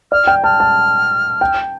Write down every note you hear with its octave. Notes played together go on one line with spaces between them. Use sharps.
D5 F6
G5
A5 F6
A5
G5